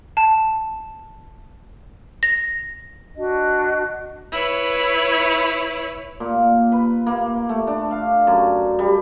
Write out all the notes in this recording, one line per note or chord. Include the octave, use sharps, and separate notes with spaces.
A5
A#6
D4 F#4 D#5
E4 B4 C#5
A#2
B4
A#3
A3
D4
F5
F#2
G3